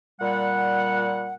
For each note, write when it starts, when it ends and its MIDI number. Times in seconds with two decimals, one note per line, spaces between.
0.21 1.35 46
0.21 1.35 55
0.21 1.35 78